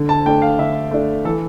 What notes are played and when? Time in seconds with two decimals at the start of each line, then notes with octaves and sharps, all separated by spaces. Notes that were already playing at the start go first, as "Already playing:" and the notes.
Already playing: D3
0.09 A5
0.25 A3 D4 G5
0.42 F5
0.59 D3 E5
0.91 A3 D4
1.25 E3 A4